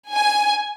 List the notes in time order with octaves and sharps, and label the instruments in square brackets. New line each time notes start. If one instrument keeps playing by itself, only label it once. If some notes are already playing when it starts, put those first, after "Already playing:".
[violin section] G#5